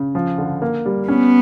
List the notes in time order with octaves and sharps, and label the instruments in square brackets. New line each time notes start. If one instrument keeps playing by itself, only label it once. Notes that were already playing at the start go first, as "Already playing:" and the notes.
Already playing: [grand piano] C#3
F3
D3
A#3
G3
[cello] B3 [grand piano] C#4